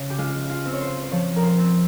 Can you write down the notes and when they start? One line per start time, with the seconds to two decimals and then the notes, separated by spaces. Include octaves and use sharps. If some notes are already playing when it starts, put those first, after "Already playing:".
Already playing: C#3
0.10 G4
0.18 G#3 F4
0.50 F4
0.66 C4
0.73 C#5
0.81 C5
1.04 C5
1.12 F3 C#5
1.36 A#4
1.42 C5
1.58 C4